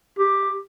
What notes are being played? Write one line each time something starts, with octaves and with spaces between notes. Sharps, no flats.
G4